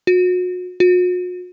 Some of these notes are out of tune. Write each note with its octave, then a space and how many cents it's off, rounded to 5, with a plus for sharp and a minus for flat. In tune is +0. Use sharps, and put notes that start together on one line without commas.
F#4 -35
F#4 -45